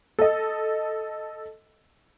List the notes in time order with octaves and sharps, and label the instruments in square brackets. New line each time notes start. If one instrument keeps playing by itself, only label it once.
[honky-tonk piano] A4 D#5